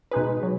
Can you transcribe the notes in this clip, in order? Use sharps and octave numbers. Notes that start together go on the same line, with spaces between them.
B2 G#3 D#4 G#4 B4
F#3